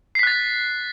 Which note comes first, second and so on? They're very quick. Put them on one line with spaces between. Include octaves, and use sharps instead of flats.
C7 B6 F#6 A6